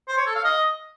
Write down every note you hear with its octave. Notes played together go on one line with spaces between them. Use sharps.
C5
C#5
A4
F5
D#5